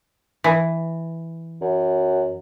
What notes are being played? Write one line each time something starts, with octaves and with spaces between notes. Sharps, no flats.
E3
F#2